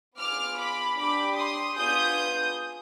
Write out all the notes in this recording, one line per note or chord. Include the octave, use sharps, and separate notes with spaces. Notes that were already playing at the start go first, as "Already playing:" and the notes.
B3 F4 G#4 D6 F6
B5 D6
D4 G4 B5 D6
C6 D#6
B3 D4 F4 G#4 D#6 G6